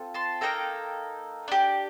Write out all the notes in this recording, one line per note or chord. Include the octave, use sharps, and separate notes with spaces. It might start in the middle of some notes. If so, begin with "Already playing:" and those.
Already playing: C4 F4 A4
A5 C6
A#3 D#4 A4 G5 A#5
D4 G4